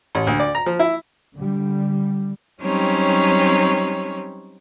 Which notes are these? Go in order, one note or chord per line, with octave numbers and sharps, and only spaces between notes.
A1
D2
D5
A#5
F3
E4
D3 G3
F#3 G3 C4 C#4 D#4 C#5